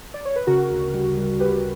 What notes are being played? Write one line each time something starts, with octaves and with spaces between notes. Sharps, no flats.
D5
C#5
B4
C#3 F#4 A#4
D2
G3
G3
G3 G4 B4